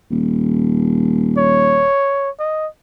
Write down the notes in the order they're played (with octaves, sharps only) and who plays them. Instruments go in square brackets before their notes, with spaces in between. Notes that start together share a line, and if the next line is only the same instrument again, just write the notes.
[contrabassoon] D#1
[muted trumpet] C#5
D#5